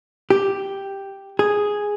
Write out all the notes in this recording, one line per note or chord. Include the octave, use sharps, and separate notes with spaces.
G4
G#4